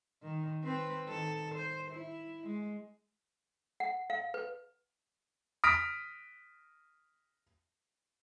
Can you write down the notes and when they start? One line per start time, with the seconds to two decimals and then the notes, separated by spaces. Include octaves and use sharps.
0.23 D#3
0.63 C4 B4
1.07 D#3 A4
1.55 C5
1.91 E4
2.46 G#3
3.80 F#5
4.10 F5
4.34 B4
5.64 D#6 F6 A#6 B6 D7